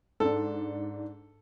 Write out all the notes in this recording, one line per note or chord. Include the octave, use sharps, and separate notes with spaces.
G#2 D4 A4